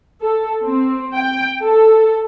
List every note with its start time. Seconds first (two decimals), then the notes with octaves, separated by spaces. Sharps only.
0.22 A4
0.63 C4
1.14 G5
1.62 A4